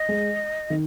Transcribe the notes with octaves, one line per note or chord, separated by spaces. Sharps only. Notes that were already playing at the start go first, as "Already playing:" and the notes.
Already playing: D#5
G#3
D#3